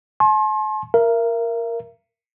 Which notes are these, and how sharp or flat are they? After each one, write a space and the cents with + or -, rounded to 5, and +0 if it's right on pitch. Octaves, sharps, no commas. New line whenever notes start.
A5 -45 C6 +35
A#4 +0 E5 +40